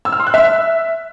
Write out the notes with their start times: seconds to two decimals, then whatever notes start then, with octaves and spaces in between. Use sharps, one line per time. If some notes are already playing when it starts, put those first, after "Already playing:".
0.05 E6
0.12 F6
0.20 C6
0.27 F#6
0.34 E5